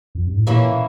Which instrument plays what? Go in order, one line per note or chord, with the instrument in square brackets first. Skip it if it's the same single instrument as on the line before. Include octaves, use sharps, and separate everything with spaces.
[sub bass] F2
G2
A2
[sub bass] A#2 [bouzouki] E3 A#3 C#4 E4